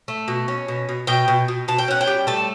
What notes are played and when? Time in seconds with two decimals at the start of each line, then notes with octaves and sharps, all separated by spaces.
0.08 A3
0.28 B2
0.48 C#4
0.68 B2
0.89 B2
1.07 B2 G5
1.28 B2
1.48 B2
1.68 B2 A5
1.78 G5
1.88 C#4 F#5
2.01 G5
2.07 G3
2.27 A3 A5